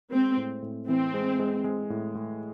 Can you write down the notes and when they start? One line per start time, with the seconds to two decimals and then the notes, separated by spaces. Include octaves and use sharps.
0.12 G#3 C4
0.37 A2
0.62 A2
0.88 E3 C4
1.14 G#3
1.39 G#3
1.64 G#3
1.90 A2
2.15 A2